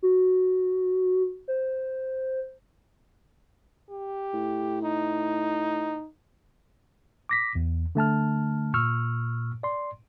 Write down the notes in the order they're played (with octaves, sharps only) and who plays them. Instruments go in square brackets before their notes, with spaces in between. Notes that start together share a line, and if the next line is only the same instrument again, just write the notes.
[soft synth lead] F#4
C5
[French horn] G4
[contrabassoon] A2
[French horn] D#4
[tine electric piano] D6 A#6 B6
E2
D3 A3 A5 F6
A#2 C#6 E6 F6
D5 C6